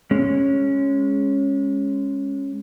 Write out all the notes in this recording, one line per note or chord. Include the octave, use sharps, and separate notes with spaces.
G#3 C#4